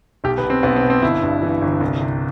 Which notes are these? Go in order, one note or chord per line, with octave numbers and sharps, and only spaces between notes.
B1 G4
B4
B2
C4
B1 B3
C4
B2
C4
G1 E4
G2
E3
G1
C2
C3